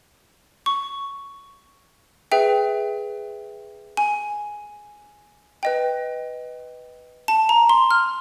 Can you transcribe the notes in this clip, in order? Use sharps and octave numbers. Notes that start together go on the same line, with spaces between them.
C#6
G#4 B4 E5 G5
G#5
B4 D#5 G5
A5
A#5
C6
F6